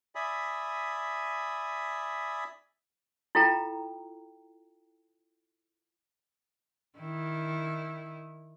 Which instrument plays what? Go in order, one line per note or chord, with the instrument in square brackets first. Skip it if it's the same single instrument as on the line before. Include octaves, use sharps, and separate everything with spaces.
[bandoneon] D5 E5 G#5 B5 D#6
[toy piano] E4 F4 A4 G5 A#5
[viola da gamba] D#3 E4